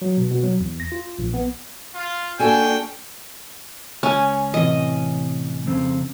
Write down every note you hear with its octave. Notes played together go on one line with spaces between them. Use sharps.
F#3
B2
B2
F#3
E2
A#6
F4
A#1
B3
F4
A#3 D4 F#4 A4 G5 G#5
C#2 C#4 G#5
A2 C3 E3 D#5
F2 C#3 C4